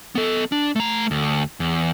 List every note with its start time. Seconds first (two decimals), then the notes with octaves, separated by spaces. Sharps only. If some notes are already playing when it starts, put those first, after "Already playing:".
0.15 B3 A4
0.52 D4
0.76 A3 A#5
1.11 D2
1.60 E2